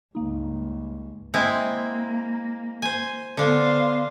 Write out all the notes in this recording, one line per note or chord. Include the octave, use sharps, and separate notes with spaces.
C#2 G2 A#3 D#4
G#3 A#3 C4 E4
C5 G#5
D3 B3 D4 C5 F5